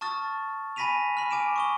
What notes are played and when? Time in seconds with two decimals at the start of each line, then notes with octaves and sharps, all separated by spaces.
0.01 A5 C#6 D#6 F6 A6
0.76 G#5 B5 A#6 B6 D#7 F7
1.17 B5 F6
1.31 G#5 D6 D7 E7
1.56 C#6 D#6 G7